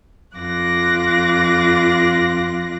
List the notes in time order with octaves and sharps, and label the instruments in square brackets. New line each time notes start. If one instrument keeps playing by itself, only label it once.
[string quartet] F2 F4 D6 F#6 A#6